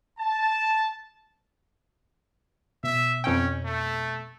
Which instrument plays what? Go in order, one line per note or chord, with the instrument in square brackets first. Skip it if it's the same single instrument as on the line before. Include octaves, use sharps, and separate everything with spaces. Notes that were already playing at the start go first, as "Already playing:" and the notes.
[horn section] A5
[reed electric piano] B2 [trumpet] E5
[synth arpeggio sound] F2 G5 [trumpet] C#4
[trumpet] A3